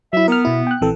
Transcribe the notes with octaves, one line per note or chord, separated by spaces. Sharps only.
F#3 E4 E5
B3 A#4 F6
B2 E4
G5 F#6
A#1 E3 C4 A4